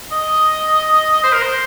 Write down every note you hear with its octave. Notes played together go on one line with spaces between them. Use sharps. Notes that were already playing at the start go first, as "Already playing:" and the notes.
D#5
C5
A#4
C5